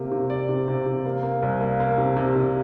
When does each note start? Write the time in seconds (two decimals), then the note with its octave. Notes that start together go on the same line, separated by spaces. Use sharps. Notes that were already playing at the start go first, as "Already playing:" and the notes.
Already playing: C3 A#3 G4
0.11 C3
0.30 D5
0.49 C3
0.68 C3
0.86 C3
1.06 A#3
1.23 A#3
1.42 C2
1.61 A#3
1.80 A#3
1.98 C3
2.17 C3
2.35 C3